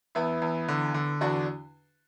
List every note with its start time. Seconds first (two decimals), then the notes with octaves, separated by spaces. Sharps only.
0.15 E2 B3 E4
0.42 E2
0.68 D3
0.94 D3
1.21 E2 D4 F#4